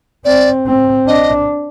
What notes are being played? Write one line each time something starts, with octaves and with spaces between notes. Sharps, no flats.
C4 D5
C4
D4 D#5